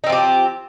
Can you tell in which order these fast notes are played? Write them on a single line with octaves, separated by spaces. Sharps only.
D#4 C4 F3 G4